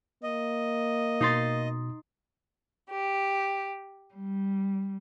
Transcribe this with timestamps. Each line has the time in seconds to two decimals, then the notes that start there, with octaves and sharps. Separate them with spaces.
0.23 A#3 D#5
1.21 B2 D#4 C6 A6
2.90 G4
4.14 G3